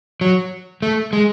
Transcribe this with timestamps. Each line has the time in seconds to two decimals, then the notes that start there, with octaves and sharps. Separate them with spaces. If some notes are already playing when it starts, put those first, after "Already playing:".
0.21 F#3
0.82 A3
1.13 G#3